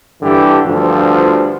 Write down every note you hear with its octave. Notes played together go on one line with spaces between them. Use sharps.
G2 D3 E3 G4
D2 G2 F3